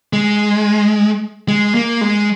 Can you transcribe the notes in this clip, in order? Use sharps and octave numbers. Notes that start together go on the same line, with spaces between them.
G#3
G#3
A#3
G#3